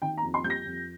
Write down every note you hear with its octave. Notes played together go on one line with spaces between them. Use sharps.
D#3 G5
A#5
F2
C6
G3 G6
A#6
F2